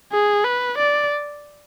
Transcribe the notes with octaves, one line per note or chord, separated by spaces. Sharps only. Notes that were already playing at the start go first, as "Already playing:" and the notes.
G#4
B4
D5